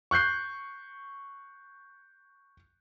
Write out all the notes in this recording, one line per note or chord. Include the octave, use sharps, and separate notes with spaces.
C#6 F#6 G6 C7